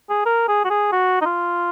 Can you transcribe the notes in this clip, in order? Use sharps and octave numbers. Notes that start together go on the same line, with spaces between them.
G#4
A#4
G#4
F#4
G#4
F#4
D#4
F4